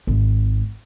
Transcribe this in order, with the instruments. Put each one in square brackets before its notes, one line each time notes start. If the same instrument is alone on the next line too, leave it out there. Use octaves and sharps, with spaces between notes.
[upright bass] G#1